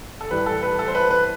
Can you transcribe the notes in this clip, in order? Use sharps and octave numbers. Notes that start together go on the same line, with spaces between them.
A4
A2 E3 G3 B4
A4
B4
A4
C5
B4
B4